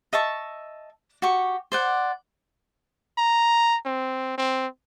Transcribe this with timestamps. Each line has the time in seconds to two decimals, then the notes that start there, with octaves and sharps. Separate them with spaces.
0.13 D#5 E5 A5 C#6
1.22 F#4 G4 C#6
1.72 C5 D5 F#5
3.18 A#5
3.86 C4
4.38 C4